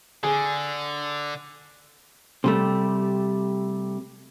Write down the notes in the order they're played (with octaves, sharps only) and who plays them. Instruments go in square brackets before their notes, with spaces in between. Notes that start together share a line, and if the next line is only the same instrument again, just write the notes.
[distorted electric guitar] D3 [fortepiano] G#4
[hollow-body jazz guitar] C3 G3 A3